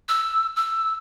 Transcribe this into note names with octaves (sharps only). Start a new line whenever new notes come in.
E6
E6